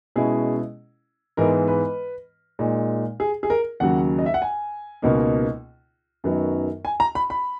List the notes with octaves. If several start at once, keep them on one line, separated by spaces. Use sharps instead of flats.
B2 G#3 C#4 E4 G#4
G#2 E3 G#3 B3 A#4
B4
A#2 G#3 D#4
G#4
G#4
A#4
D#2 C#3 F#3 F#5
D#5
E5
F#5
G#5
C#2 B2 A#3 D#4
F#2 D#3 F#3 B3 D#4
G#5
A#5
B5
B5